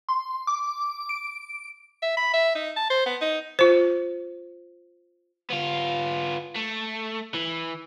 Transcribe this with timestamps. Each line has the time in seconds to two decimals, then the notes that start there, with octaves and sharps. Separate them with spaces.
0.09 C6
0.47 D6
1.09 D7
2.02 E5
2.17 B5
2.34 E5
2.55 D#4
2.77 A5
2.90 C5
3.06 B3
3.21 D#4
3.59 F4 C5
5.51 B3 F4
6.56 A3
7.35 E3